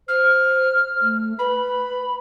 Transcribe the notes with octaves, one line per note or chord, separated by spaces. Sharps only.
C5 F6
A3
B4 B5